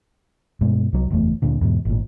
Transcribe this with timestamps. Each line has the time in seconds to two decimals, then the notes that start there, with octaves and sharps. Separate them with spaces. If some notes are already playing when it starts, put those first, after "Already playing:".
0.61 G2 B2 G#3
0.93 C2 F#3
1.10 F#1 E2 A3
1.42 D2 A#2 D3
1.61 E2 G#2 B2
1.85 G#1 A#2